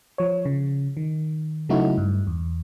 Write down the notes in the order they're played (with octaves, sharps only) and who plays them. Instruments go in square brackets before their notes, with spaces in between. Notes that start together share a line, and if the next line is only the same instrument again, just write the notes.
[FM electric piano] F3 C#5
C#3
D#3
C#3 F#3 A3 D#4 E4 F#4
G2
E2